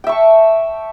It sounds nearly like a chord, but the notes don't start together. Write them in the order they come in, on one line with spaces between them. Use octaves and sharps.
G5 E5 C#6 A5